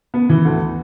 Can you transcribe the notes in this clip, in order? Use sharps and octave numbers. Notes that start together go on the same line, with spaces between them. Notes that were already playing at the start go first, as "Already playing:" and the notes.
B3
E3
D2